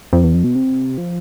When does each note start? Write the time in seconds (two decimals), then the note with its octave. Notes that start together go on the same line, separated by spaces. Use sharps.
0.13 F2
0.24 E2
0.35 F2
0.44 B2
0.55 C3
0.98 F3